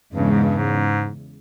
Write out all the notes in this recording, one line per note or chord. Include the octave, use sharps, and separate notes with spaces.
E2 G2 C#3 G#3
G#2
G2
G#2